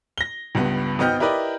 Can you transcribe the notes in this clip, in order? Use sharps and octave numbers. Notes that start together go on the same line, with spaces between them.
A#6 G7
C#2 G2 B3
G#1 B3 D#5 G5 F6 G6
E4 G4 A#4 B4 D5 D#5